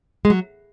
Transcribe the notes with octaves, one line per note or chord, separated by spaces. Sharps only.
G#3
F#3